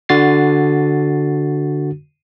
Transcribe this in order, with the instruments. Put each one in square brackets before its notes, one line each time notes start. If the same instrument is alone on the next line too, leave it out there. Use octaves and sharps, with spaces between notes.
[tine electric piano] D3 F#4 A6 C7